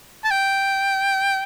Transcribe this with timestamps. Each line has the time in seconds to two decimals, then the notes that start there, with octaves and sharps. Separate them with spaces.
0.24 A5
0.31 G5